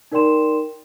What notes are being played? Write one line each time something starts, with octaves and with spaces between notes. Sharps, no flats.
D#4 A#4 D5 G5 C6 E7